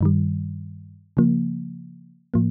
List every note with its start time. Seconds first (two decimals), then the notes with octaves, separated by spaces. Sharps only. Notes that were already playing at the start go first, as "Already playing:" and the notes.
0.01 G2 D#3 G3
1.17 C#3 F3 A#3
2.34 A2 F3 A#3